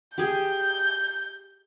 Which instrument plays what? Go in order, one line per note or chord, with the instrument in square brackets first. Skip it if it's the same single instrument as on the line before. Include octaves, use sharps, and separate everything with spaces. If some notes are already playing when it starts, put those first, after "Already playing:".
[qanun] G4 G#4 [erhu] G6